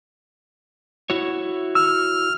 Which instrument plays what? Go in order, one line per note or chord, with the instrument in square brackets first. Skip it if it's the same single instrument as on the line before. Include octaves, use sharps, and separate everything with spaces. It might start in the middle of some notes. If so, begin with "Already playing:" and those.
[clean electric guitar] E4 F#4 C#5
[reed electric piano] E6 [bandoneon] F6